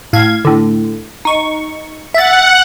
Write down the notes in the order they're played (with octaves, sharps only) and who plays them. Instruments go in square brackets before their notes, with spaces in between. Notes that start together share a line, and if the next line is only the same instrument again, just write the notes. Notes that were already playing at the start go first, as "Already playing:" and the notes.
[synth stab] A2 F5 G#6
A2 D3
D#4 C#6
[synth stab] E5 A6 [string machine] F#5